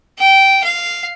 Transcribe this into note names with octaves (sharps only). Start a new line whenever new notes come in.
G5
F5